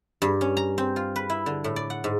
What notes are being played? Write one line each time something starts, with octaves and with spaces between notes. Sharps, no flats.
G2
C#4
A#5
C4
F4
B4
E4
D3
A2
D5
F#5
G#2